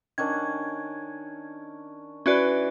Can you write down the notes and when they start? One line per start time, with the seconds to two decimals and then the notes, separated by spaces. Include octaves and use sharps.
0.18 D#3 C#4 D4 G#6
2.26 E3 C#4 F#4 B4 D5